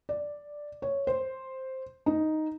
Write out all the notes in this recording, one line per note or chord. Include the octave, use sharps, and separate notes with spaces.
D5
C#5
C5
D#4